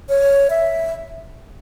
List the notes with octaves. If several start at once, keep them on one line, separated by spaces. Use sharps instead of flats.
C#5
E5